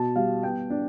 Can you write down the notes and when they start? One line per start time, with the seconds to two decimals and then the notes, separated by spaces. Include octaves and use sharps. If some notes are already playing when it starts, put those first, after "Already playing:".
Already playing: B2 A5
0.16 G3 F5
0.43 B3 G5
0.70 D4